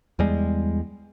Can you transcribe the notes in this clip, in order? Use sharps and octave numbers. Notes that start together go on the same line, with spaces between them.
E2 G3 G#3